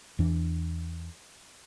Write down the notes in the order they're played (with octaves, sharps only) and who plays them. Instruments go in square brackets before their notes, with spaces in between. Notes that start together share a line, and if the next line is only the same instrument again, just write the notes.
[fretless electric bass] E2 E3 D4